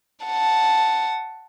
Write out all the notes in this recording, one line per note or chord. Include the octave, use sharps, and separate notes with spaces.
F#5 A5